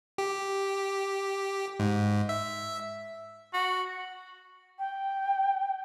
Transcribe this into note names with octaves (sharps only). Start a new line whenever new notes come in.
G4
G#2
E5
F#4
G5